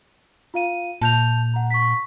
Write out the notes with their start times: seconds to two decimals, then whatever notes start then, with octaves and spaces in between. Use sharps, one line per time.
0.54 F4 F5 D#7
1.01 A#2 A5 G6 F7
1.54 F#5 A#5
1.70 C#6 B6